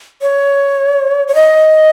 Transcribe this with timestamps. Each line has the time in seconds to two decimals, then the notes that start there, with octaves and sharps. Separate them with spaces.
0.22 C#5
1.28 C#5
1.35 D#5